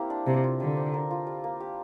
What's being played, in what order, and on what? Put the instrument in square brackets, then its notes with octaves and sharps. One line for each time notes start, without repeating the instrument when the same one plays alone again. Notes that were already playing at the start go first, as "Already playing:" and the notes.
Already playing: [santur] A#3 C4 E4 G4
D4
[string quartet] C3 [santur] A#4
[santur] F4
[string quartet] D3 [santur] G3
[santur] C4
A#4
F4
G3
A#3
G4